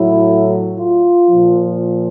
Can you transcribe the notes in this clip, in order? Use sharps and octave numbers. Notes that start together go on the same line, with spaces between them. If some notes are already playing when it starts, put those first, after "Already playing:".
Already playing: A2 F#3 E4
F4
A#2 F3